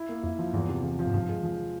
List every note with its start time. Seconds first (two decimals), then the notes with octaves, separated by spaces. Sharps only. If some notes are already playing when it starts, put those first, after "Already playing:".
Already playing: E4
0.09 A#3
0.23 F2 E4
0.39 F3
0.53 E2 G2
0.69 C3
0.83 E2
0.99 F3
1.06 G#2
1.14 G2 F3
1.29 G#3
1.44 F3